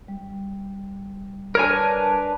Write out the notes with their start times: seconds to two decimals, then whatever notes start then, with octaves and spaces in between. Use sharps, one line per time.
0.08 G3
1.55 D4 A#4 B4 C#5 G#5